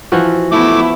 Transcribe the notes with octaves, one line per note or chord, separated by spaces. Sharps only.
E3 F3 F#4
A3 B3 E4 D6